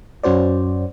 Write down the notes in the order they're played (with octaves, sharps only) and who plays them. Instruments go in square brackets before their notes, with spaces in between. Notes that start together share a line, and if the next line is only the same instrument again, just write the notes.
[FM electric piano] F#2 C#4 F#4 C5 D5